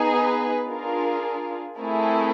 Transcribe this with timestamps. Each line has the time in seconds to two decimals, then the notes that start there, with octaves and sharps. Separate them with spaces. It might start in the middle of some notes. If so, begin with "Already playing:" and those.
Already playing: B3 D#4 G#4
0.15 B4
0.70 D4 F4 G#4 A#4
1.78 A3 C4 E4 G#4 A#4